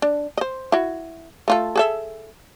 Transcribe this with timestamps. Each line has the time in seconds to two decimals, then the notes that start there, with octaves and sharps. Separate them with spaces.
0.02 D4
0.37 C5 D#5
0.72 E4 F#4
1.48 A3 F4 A4
1.76 G#4 A4 E5